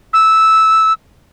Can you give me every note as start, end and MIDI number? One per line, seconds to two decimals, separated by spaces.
0.13 0.93 88